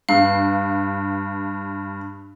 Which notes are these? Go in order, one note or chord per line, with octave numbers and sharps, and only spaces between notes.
G2 F5